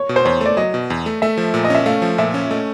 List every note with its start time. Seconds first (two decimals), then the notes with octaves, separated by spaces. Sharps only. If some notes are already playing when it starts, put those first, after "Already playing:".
Already playing: C#5
0.09 B2
0.16 C5
0.25 E2 C#5
0.41 A3 D5
0.57 F#3 D#5
0.74 B2
0.90 E2
1.06 A3
1.22 A3 E5
1.38 F3
1.54 A#2
1.64 D#5
1.70 C#4 E5
1.86 A3 F5
2.02 F3
2.18 A#2 E5
2.34 C#4
2.50 A3 D#5